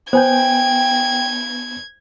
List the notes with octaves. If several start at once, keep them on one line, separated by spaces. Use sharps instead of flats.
B3 C5 G5 G#5 G6 G#6